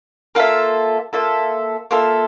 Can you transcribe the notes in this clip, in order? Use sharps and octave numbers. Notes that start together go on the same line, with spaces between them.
A#3 F4 A4 E5
A#3 F4 A4 E5
A#3 F4 A4 E5